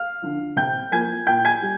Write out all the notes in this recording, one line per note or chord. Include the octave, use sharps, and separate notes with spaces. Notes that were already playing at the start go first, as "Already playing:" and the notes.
Already playing: F5 F6
D3 F3
C3 G5 G6
F3 A#3 G#5 G#6
A#2 G5 G6
G#5 G#6
G3